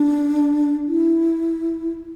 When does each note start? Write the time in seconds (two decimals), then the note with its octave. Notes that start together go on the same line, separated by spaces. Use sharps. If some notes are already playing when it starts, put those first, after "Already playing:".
Already playing: D4
0.88 E4